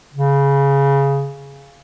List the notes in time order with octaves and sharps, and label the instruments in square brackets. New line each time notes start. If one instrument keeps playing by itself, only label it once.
[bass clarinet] C#3